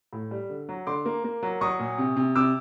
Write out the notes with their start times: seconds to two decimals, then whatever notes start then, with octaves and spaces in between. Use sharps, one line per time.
0.13 A2
0.31 G3
0.50 D3
0.69 F#3
0.87 D3 C6 D6
1.06 A#3
1.24 A#3
1.43 F#3
1.61 F#3 C#6 D#6
1.79 A#2
1.98 C3
2.17 C3
2.36 C3 D6 E6